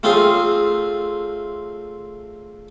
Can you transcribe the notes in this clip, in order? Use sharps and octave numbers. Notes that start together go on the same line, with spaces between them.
A3 C4 C#4 F4 G#4